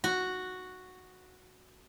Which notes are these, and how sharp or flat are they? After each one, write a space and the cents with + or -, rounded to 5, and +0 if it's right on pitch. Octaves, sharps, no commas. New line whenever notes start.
F#4 -5